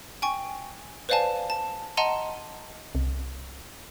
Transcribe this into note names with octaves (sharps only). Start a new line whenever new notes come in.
G5 G#5 C#6
B4 C5 D5 F5 G#5 A5
A5
D#5 F#5 A5 A#5 C6 D#7
C2